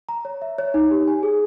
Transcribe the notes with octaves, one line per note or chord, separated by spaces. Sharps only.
A#5
C#5
E5
C#5
D#4
G4
G#5
G#4